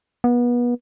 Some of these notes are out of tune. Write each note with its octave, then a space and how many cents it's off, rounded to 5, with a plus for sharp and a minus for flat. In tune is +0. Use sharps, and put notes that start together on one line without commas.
B3 -30